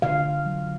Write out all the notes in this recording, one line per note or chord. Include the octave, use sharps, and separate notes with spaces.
D3 F5
D3
F#3